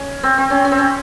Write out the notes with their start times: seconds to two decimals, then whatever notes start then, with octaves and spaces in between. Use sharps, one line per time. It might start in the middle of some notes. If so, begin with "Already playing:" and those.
Already playing: C#4
0.23 C4
0.38 C4
0.50 C#4
0.65 C#4
0.72 C4
0.78 C#4